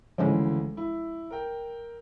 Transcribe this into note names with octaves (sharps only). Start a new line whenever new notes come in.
D2 C#3 E3 F3 G#3 C#4
E4
A#4 G5